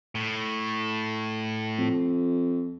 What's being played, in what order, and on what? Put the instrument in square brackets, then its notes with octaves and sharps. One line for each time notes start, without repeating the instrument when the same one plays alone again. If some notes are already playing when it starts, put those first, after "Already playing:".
[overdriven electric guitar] A2
[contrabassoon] F2